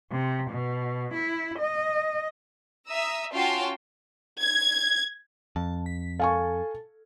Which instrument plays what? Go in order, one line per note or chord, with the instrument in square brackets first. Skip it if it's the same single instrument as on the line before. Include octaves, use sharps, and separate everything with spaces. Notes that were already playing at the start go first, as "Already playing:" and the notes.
[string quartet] C3
B2
E4
D#5
[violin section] E5 A#5 D#6 E6
C#4 F4 F#4 F5 G5 A5
[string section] G#6
[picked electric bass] F2 [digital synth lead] A5
[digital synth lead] B6
[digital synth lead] A4 [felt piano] F5 G#5 C#6